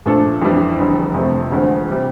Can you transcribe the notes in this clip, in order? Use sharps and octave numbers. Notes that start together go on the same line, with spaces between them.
A#2 F3 A3 D4 A4
F2 E3 G3 D4
F1 E2 D3 G3
F2 C3 F3 A3
E1 D2 D3 F3
C3 G3